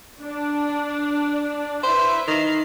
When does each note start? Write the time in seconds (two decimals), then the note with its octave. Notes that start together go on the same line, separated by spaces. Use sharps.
0.19 D4
1.83 E4 B4 C5 E5
2.27 D#3 C7